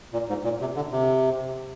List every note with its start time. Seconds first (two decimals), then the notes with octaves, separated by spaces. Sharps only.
0.13 A#2
0.29 G#2
0.44 A#2
0.60 C3
0.76 D3
0.92 C3